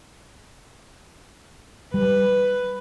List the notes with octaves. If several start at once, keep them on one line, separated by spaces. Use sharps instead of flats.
G3 B4